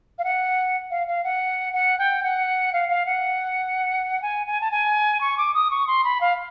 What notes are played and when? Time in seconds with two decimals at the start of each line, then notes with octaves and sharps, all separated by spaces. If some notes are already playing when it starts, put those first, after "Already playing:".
0.19 F5
0.24 F#5
0.91 F5
1.07 F5
1.24 F#5
1.73 F#5
1.99 G5
2.23 F#5
2.73 F5
2.89 F5
3.06 F#5
4.22 G#5
4.47 G#5
4.61 A5
4.71 G#5
5.21 C#6
5.38 D6
5.54 D#6
5.71 C#6
5.87 C6
6.04 B5
6.21 F5